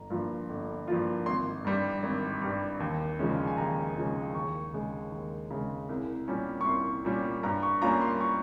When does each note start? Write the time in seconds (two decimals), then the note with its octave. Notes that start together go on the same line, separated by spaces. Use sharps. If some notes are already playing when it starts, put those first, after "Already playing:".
Already playing: G1 A#5
0.10 G2 F3 A#3 F4
0.49 G1
0.88 G2 F3 A#3 F4
1.26 G#1 C6
1.65 G2 G3
2.03 G#1
2.42 G2 G3
2.80 D#2
3.19 C#3 F3 G#3 C#4
3.47 G#5
3.58 D#2 A#5
3.96 C#3 F3 G#3 C#4
4.34 D#2 C#6
4.73 C#3 G#3
5.12 D#2
5.50 C#3 G#3
5.89 C2
6.28 A#2 G3 C#4
6.61 C#6
6.66 C2 C6
7.05 A#2 G3 C#4
7.43 G2 A#5
7.63 C#6
7.82 G3 A#3 C#4 F4 A#5
8.01 C6
8.21 C#6